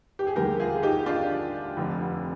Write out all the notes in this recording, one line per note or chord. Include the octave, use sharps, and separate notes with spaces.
G4
G#4
D#2 D3 G3 G4 A#4
F4 G#4
D#4 G4
D4 F4
F1 F2 D3